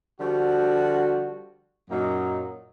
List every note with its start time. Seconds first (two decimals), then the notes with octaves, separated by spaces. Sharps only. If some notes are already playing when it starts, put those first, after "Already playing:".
0.20 D3 F3 G3 F#4
1.90 F#2 A#2 F#3 A#3 D#4